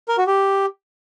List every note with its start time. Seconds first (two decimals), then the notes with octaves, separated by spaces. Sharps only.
0.08 A#4
0.18 F#4
0.27 G4